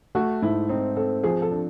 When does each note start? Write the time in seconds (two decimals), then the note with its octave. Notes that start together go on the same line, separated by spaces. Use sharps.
0.15 A3 F#4
0.42 G#2 E4
0.69 C4 D#4
0.97 C4 A4
1.23 F3 G#4
1.42 A4
1.52 D4